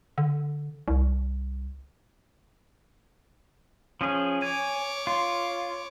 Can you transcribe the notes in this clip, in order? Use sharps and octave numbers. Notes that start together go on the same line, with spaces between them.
D3
C2
F3 C#4 G#4
C#5 G#5 D6
F4